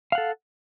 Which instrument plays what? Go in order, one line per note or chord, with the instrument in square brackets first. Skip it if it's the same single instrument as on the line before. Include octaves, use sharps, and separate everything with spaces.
[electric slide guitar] F5
F#5
A4